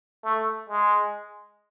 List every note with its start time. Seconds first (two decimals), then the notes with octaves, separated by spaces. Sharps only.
0.25 A3
0.70 G#3